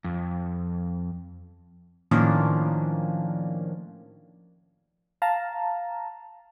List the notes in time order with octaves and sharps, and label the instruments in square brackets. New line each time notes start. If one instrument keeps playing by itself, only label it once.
[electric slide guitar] F2
[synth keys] A2 D#3 F3 A#3 C#4 D4
[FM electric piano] F5 A5 A#5